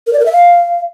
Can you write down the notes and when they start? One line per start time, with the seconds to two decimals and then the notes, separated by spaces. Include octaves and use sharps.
0.07 A#4
0.13 D5
0.19 A#4
0.26 E5
0.32 F5